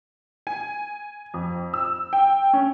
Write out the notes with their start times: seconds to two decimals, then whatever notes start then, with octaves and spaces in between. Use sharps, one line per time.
0.47 G#5
1.34 F2
1.74 E6
2.13 G5
2.53 C#4